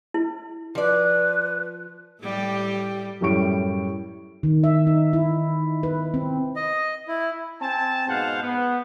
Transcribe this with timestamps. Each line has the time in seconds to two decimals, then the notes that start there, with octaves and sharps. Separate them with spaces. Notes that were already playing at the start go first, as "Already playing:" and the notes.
0.14 E4
0.75 F3 B4 D5
2.21 A2 G3 G4
3.21 F#2 A2 G3 C#5 C#6 D7
4.43 D#3
4.64 E5
4.87 D#4
5.13 E4
5.83 B4
6.14 C4
6.56 D#5
7.08 E4
7.61 C4 G#5 A5
8.07 G#2 B2 C5 F5 F#5
8.42 B3